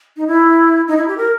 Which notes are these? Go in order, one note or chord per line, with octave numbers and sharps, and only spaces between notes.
D#4
E4
D#4
E4
G4
A#4